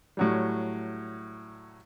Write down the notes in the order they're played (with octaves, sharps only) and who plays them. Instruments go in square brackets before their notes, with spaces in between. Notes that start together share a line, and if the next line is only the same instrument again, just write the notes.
[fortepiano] A2 F#3 G3